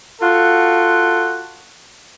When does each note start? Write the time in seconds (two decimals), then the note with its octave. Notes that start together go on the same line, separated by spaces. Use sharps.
0.21 F4 F#4 A4